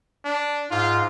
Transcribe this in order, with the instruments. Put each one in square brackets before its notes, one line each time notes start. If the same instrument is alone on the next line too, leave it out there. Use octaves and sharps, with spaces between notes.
[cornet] D4
[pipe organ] G#2 [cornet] F4